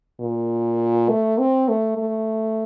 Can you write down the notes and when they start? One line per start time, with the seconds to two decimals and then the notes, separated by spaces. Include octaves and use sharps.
0.20 A#2
1.09 A3
1.38 C4
1.69 A3
1.98 A3